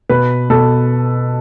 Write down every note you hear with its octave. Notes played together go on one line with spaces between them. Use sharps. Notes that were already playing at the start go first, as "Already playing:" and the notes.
B2 B4
B2 A4